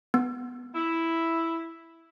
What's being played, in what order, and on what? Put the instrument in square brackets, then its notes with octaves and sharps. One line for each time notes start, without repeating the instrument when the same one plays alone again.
[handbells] B3
[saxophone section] E4